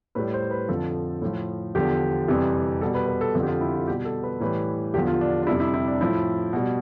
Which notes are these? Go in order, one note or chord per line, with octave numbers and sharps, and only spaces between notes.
A2 G3 B4
C5
B4
F2 D3 F3 A4
A2 F3
E2 D3 F3 G4
F2 C3 E3 G3
B2 G3 A4
B4
B4
A4
F2 D3 F3
G4
F4
E4
F4
B2 G3 G4
A4
B4
A2 E3 G3 B4
E2 D3 F3 G4
F4
D4
D4
F2 C3 G3 E4
E4
E4
D4
A2 F3 E4
B2 G3